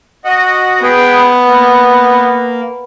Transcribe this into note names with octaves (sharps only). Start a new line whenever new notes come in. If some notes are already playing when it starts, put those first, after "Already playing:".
F#4 D#5 F#5
B3 G#4 B4 G5
A#3